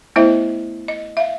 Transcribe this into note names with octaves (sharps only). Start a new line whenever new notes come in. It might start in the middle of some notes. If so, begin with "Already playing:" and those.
A3 B3 E4 C5 D#5 E5
D#5
E5 F5